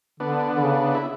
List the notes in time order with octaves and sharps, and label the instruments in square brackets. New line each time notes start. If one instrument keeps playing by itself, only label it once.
[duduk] D3 [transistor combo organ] B3 D4
[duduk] D3
C#3
[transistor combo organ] E4